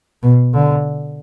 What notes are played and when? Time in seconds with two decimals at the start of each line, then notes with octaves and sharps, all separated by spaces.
0.23 B2
0.54 D3